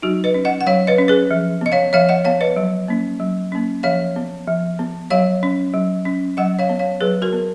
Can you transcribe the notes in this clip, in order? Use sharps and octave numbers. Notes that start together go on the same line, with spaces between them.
F#3 D#4 F#4
B4 D#5
C#4
D#5 F#5
F#5
F#3 C#5 F5
B4 D#5
C#4
G#4 B4
F3
B3 D#5
C#5 F5
F3 C#5 F5
D#5 F#5
B3 C#5 F5
B4 D#5
F#3
A#3 C#4
F#3
A#3 C#4
F3 C#5 F5
B3
F3
B3
F#3 C#5 F5
C#4
F#3
C#4
F#3 D#5 F#5
C#5 F5
B3
C#5 F5
F#3 G#4 B4
F#4 A#4
B3